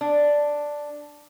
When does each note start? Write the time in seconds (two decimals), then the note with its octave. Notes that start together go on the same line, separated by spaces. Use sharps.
0.01 D4